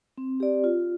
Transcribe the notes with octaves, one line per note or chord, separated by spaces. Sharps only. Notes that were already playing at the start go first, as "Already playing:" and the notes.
C4
G4 D5
F4